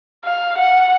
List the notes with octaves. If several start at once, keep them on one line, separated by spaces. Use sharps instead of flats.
F5
F#5